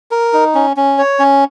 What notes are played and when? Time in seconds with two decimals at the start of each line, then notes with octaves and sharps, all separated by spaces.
0.11 A#4
0.33 D#4
0.55 C#4
0.77 C#4
0.98 C#5
1.19 C#4